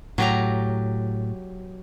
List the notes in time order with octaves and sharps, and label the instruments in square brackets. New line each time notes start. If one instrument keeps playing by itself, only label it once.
[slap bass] A2 [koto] F#3 G4 A#5